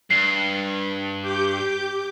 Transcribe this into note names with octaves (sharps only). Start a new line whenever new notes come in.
G2 C7
G4 D6 G6